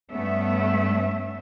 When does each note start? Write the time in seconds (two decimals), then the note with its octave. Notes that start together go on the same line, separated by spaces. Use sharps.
0.11 G2 A3 B3 C#4 E5